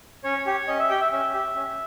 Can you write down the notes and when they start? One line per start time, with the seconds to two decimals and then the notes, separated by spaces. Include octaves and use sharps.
0.24 C#4 C#5
0.46 G4 C#5
0.68 C#4 D#5
0.79 E5
0.89 G4 G5
1.01 E5
1.12 C#4 E5
1.34 G4
1.55 C#4